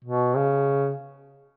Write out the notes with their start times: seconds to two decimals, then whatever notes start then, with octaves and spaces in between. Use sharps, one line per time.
0.04 B2
0.36 C#3